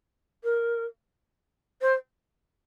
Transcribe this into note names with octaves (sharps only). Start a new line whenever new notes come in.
A#4
C5